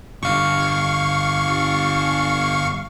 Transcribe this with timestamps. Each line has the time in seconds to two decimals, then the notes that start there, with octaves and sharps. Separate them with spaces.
0.23 G2 D3 F5 C#6